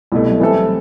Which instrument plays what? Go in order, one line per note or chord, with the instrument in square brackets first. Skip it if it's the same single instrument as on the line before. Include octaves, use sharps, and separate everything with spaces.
[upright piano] C2 B2 A3 [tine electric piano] G3
[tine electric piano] F#3
[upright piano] E3 A3 C4 E4 A4 [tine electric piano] G3